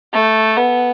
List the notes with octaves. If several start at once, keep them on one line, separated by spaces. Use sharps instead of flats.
A3
B3